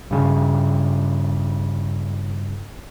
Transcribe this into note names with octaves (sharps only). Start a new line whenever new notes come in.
G2 C#3